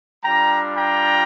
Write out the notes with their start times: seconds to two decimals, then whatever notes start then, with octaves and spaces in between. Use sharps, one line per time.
0.24 G3 D4 F4 G5 A#5
0.77 G5 A#5